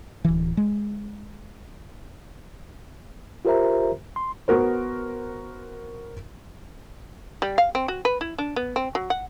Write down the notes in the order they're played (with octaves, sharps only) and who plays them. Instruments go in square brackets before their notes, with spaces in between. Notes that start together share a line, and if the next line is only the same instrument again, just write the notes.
[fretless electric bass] D1 E3
G#3
[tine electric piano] F4 G4 A#4 C5 E5 A#5
C6
[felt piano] B3 F#4 A#4 C5
[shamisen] G3
F5
C4
F#4
B4
E4
D4
B3
C4
F#3
F#5